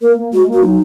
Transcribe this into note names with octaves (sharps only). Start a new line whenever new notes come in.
A#3 A#4
A#3
G#3 F#4
A#3
F#4
F#3 D#4